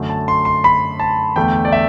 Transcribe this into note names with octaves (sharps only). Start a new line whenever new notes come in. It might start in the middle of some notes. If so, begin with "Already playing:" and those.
Already playing: F#2 D3 A3
A5
C6
C6
B5
A5
E2 D3 A3 G5
D5
E5